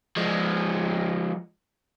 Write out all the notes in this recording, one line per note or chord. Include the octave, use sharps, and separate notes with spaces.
F3 G#3